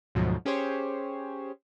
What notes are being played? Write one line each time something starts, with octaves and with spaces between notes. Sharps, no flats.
D2 G#2 B2 F3 F#3
C#4 G4 G#4 C5 C#5